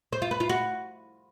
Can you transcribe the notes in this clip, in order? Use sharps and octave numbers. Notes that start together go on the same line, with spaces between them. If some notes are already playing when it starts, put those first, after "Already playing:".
C5
F4
B4
F4
F#4